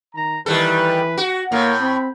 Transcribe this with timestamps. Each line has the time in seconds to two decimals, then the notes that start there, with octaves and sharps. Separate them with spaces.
0.14 D#3 A#5
0.46 D#3 E3 G3 A4 B4
1.17 F#4
1.52 A2 A#3 A#4 C#5
1.80 C4 B5